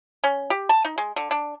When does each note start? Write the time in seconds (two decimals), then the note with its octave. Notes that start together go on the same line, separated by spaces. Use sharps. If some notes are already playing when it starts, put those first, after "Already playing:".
0.24 C#4
0.50 G4
0.69 A5
0.85 D#4
0.98 G#3
1.16 D3
1.31 D4